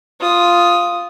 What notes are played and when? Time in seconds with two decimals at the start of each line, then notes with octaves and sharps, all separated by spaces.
0.20 F4 D#6